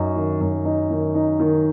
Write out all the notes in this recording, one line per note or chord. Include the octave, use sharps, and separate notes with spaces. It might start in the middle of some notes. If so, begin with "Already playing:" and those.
Already playing: F#2 D#4
D#3
F#2
D#4
D#3
D#4
D#3